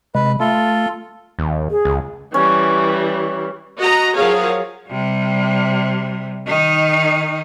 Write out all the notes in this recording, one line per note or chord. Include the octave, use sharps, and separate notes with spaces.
C3 G#3 B4
A3 F4 A4
D#2
G#4
C#2
E3 G3 C#4
F#4 D#5 A#5
F3 F#3 G#4 A#4 C#5 F5
C3 G3
D#3 D#4